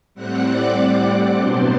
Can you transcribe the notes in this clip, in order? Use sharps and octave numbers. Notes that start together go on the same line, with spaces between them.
A2 G3 C4 F#5 F#6
D5 D6
B2 F#3 B3 D4 C5 C6